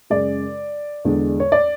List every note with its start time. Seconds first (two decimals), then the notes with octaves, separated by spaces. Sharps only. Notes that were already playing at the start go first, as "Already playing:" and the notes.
0.10 F#2 C#3 G#3 D5
1.05 E2 D3 G#3
1.40 C#5
1.52 D5